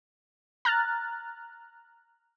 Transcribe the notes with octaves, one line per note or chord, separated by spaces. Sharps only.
A#5 F6 F#6 A6